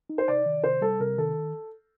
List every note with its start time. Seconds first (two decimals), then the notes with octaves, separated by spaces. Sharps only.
0.10 D#4
0.18 C5
0.28 C3 D5
0.46 D#3
0.64 C3 C5
0.81 G3 A4
1.00 C3 A#4
1.18 D#3 A4